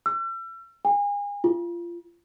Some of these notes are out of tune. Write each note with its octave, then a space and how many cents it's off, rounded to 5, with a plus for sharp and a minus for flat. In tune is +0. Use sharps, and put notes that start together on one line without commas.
E6 +40
G#5 -35
F4 -25